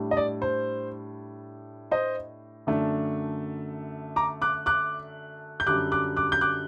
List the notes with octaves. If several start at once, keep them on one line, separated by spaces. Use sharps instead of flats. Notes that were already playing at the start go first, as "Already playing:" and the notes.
Already playing: A2 G3 D4
D#5
D5
C5
C5 D#5
F#2 D3 A3 D4
A#5 D6
D6 F#6
D6 F#6
G6
F#2 D3 G3 D6 F#6
D6 F#6
D6 F#6
G6
D6 F#6